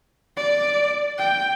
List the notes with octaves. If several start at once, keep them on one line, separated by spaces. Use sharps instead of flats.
D5
G5